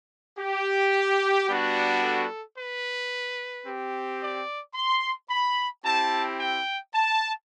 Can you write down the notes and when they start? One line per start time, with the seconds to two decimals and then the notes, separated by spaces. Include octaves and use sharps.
0.39 G4
1.49 G3 B3 D4 F#4
2.03 A4
2.57 B4
3.66 C4 G4
4.21 D5
4.75 C6
5.29 B5
5.84 C4 E4 G4 A5
6.39 G5
6.94 A5